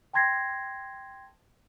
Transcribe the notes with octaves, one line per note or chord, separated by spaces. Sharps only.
G5 A5 C6 G#6 A#6 C7